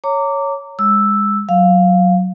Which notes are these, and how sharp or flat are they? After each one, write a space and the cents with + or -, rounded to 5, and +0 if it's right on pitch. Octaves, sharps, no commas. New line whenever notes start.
C#5 +0 A#5 -25 D6 -15
G#3 -25 E6 +0
F#3 +0 F5 +0